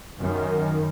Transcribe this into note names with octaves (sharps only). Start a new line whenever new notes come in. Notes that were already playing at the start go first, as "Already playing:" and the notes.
F#2 D#3